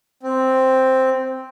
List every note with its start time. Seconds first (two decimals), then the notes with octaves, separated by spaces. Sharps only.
0.23 C4